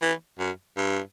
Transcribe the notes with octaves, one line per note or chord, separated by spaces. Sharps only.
E3
F#2
G2